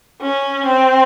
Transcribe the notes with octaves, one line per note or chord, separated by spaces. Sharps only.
C#4
C4